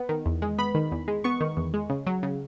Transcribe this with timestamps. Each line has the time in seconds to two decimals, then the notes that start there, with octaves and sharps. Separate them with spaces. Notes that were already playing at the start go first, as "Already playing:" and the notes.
Already playing: B3
0.09 D#3
0.26 E2
0.42 G#3
0.58 B3 B5
0.75 D#3
0.92 E2
1.08 G#3
1.24 B3 C#6
1.41 D#3
1.57 E2
1.74 G#3
1.90 C#3
2.07 F#3
2.23 C#3